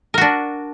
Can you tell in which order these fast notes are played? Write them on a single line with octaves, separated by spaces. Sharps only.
A#4 F#4 D4